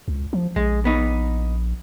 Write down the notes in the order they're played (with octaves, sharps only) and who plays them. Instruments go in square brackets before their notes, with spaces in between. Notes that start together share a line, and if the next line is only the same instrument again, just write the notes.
[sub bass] C#2
F3
[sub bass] A#1 [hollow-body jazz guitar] G#3
[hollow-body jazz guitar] B3 D#4